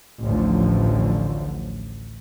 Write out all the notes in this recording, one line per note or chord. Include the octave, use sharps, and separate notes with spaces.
A1 D2 A2 D3 F3